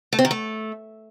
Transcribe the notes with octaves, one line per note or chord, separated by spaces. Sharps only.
A3
C4
D#3
A3